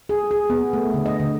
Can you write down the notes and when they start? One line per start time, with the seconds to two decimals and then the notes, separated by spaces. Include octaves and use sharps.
0.09 G#4
0.31 G#4
0.50 B3
0.73 A3
0.94 D3
1.06 D#5
1.20 D3